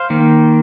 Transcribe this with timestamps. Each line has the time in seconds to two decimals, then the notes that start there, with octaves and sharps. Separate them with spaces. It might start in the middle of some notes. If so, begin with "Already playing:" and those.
Already playing: C5 F5
0.10 D#3 A#3